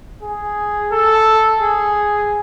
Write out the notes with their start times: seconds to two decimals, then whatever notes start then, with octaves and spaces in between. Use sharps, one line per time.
0.23 G#4
0.92 A4
1.61 G#4